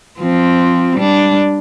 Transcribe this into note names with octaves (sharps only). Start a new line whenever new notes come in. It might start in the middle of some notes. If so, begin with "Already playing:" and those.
F3 C4
G3 D4